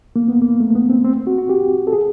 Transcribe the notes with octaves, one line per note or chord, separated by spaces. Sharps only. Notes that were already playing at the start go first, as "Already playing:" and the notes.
A#3
B3
A#3
A3
B3
C4
C4
F#4
F#4
G4
A4
G#4